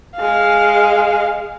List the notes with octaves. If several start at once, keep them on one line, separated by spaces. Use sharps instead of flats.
G#3 F5